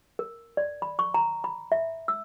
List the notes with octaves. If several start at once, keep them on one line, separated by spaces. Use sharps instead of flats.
A#4
D5
B5
C#6
A#5
B5
E5
E6